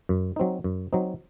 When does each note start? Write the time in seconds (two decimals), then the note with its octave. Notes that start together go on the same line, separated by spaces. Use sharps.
0.09 F#2
0.36 F#3 C4 D#4
0.64 F#2
0.93 F#3 C4 D#4